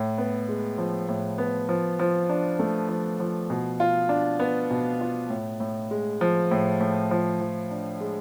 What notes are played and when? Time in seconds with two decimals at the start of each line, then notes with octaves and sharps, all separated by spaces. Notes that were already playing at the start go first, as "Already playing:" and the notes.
Already playing: A2
0.18 B3
0.49 G#3
0.78 F3
1.08 A2
1.38 B3
1.69 F3
1.99 F3
2.29 D4
2.59 A3
2.89 F3
3.20 F3
3.50 B2
3.80 F4
4.09 D4
4.40 B3
4.71 B2
5.01 F4
5.30 A2
5.60 A2
5.91 G#3
6.21 F3
6.51 A2
6.80 A2
7.11 F3
7.41 F3
7.71 D4
8.01 G#3